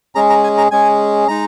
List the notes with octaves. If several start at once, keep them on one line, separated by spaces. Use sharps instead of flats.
G#3 C#4 G#4 A#5
A#5
G#5
A#5
G#3 C#4 G#4 G#5
G#3 D#4 A#5